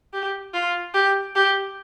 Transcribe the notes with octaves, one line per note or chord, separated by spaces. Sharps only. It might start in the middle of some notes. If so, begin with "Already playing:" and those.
G4
F4
G4
G4